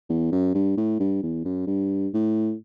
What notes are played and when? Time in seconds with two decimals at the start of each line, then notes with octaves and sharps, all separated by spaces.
0.09 E2
0.32 F#2
0.55 G2
0.77 A2
1.00 G2
1.23 E2
1.45 F#2
1.67 G2
2.13 A2